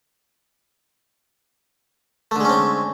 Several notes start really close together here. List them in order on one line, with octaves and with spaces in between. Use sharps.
A3 D3 G#3 C#4 C4